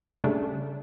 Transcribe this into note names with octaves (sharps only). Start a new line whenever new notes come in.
C#3 G3 A3 D4